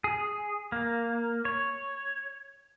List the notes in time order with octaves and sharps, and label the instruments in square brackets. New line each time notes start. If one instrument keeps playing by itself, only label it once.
[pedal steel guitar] G#4
A#3
C#5